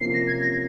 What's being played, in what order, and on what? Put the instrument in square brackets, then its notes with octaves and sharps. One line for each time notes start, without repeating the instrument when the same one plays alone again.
[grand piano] C3 F3 A#3 C#4 [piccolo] C7
[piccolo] A#6
G#6
A#6